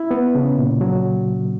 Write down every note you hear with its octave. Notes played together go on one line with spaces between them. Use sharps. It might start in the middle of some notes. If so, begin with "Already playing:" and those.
Already playing: E4
B3
C#3
A#2
F#3